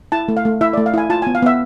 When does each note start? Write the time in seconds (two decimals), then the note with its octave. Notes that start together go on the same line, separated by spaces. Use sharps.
0.12 E4 A5
0.28 A3
0.37 F5
0.45 A3
0.61 E4 E5
0.73 D5
0.77 A3
0.86 F5
0.94 E4 G#5
1.10 F4 A5
1.22 G#5
1.27 B3
1.35 F5
1.42 B3 E5